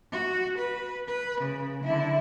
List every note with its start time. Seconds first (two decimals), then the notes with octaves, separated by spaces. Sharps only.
0.12 F#4
0.58 B4
1.07 B4
1.41 C#3
1.84 D3 E4